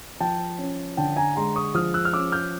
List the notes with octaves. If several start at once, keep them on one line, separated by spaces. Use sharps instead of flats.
F3 G5 A5
C#4
D3 G5 A5
G#5 A#5
G#3 A#5 C6
C#6 D#6
F3 D#6 F6
E6 F#6
F6
C#4 D6 E6
F6 G6